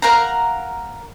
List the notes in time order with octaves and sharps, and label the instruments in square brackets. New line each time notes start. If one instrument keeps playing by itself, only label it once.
[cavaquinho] A#4 F5 F#5 A#5